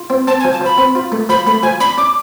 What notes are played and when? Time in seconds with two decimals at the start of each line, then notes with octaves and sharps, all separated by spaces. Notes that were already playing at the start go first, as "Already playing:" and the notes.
Already playing: F4
0.10 C4
0.27 C4 A5
0.40 G#5
0.44 F3
0.52 A5
0.61 F3 B5
0.78 C4
0.95 F4
1.12 A3
1.29 F3 B5
1.47 A3 B5
1.63 F3 G#5
1.80 D4 B5
1.98 D4 D6